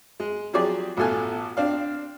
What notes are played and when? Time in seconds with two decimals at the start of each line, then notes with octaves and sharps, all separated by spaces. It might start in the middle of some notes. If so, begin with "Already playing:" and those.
0.20 G#3
0.53 F3 F#3 C4 G4 G#4 D5
0.97 A1 B2 F4 A4 G#5 F#6
1.57 C4 D4 F5